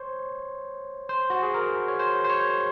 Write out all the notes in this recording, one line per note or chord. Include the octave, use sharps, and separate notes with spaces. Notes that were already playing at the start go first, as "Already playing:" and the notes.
Already playing: C5 C#5
C5
F#4
G#4
A#4
C#5
C5
C5
C#5